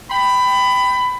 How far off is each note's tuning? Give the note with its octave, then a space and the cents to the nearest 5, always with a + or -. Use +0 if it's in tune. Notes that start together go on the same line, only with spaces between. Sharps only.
G5 +0 B5 +20